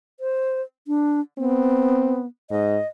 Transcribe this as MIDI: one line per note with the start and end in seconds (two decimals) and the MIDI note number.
0.20 0.61 72
0.88 1.20 62
1.38 2.26 59
1.38 2.20 60
2.50 2.78 44
2.50 2.87 75